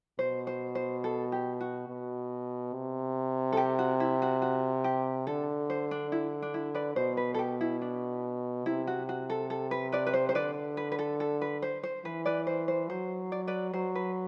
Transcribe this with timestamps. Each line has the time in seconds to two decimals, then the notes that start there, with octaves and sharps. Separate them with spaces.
0.19 B2 C5
0.47 C5
0.75 C5
1.04 A4
1.32 G4
1.60 F#4
1.88 B2
2.74 C3
3.53 A4
3.57 G4
3.79 F#4
4.00 E4
4.22 F#4
4.42 F#4
4.84 G4
5.27 D3 A4
5.70 C5
5.91 D4
6.12 E4
6.42 D4
6.54 E4
6.75 B4 D5
6.96 B2 C5
7.17 B4
7.34 A4
7.39 G4
7.61 E4
7.82 D4
8.66 C3 E4
8.87 F#4
9.09 F#4
9.30 A4
9.50 A4
9.71 B4
9.92 B4 D5
10.06 B4
10.14 C5
10.29 C5
10.35 D3 B4 D5
10.77 B4
10.92 B4
10.99 A4
11.20 A4
11.41 B4
11.62 C5
11.83 C5
12.05 E3 B4
12.26 B4 D5
12.47 C5
12.68 C5
12.90 F#3 C5
13.32 D5
13.47 B4 D5
13.73 F#3 C5
13.95 B4